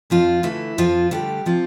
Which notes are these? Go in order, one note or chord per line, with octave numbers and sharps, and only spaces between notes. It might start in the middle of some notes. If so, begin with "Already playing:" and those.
F2 F3 F4
D3 E3 A3 E4
F2 F3 F4
D3 G3 A3 G4
C3 F3 F4